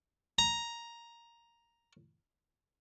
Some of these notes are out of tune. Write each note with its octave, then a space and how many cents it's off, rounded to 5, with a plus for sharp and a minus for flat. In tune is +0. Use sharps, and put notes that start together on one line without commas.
A#5 +5